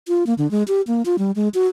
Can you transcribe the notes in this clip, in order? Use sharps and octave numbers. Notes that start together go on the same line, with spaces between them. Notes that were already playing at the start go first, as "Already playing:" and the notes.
F4
A#3
D3
G#3
G4
A#3
F4
G3
G#3
F#4